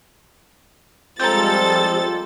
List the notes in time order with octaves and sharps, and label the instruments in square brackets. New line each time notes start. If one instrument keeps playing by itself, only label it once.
[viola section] F3 G3 G#3 [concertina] C4 [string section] A4 A6 [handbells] A#5 G6